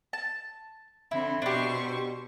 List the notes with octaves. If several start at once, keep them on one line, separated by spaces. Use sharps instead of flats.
A5
D3 C4 E4
B2 D4 G4 C5 C#6